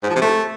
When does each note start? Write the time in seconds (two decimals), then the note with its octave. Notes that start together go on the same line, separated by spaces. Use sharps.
0.03 G#2
0.09 F3
0.16 C3
0.22 A3